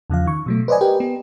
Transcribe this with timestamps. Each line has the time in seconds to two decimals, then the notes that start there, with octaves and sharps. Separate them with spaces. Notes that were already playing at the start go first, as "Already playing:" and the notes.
0.10 E2 C#3 F3 F5
0.26 D#3 C#6
0.46 B2 F#3 A3
0.68 B4 C5 D5 D#5 G#5
0.81 G4 A#4 B4 G5
1.00 B3